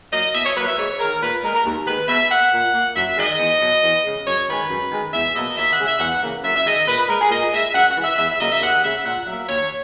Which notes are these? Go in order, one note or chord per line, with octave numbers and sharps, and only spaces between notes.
F#3 A#3 D#5
B2 E5
C#5
F#3 A#3 B4
E5
G#2 C#5
D#3 G#3 A#4
A#2 B4
G#3 A#4
A#4
D#2
D#3 G#3 B4
B2 E5
A#3 F#5
A#2
A#3
F#2 E5
D#3 G#3 D#5
E2
B2 F#3
E2
C#3 G#3
F#2 C#5
D#3 G#3 B4
F#2
D#3 G#3
E2 E5
B2 F#3 A#3 D#5
D#2 E5
F#5
C#3 G#3
E5
E2 F#5
C#3 E3 A#3
F#2 E5
E5
D#3 G#3 D#5
A#2 B4
B4
G#3 A#4
G#4
A#2 D#5
G#3 E5
F#2 F#5
F#5
E3 G#3
E5
E2 E5
E5
C#3 F#3 A#3 D#5
E5
D#2 F#5
C#3 G#3 E5
A#2 F#5
F#3 A#3 E5
D#2 C#5